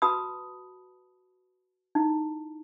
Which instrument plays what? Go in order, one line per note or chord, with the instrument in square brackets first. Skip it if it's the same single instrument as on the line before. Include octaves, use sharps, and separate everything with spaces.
[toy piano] F#4 B4 A5 B5 D#6
D#4 E4